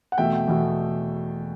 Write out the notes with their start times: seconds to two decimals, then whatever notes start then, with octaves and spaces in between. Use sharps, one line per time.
0.12 F#5
0.18 E2 B2 A3 E5 G5
0.48 E2 B2 A3